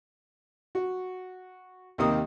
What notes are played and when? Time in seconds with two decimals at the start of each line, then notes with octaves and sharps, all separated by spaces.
0.75 F#4
1.98 D#2 C3 D#3 A#3 D#6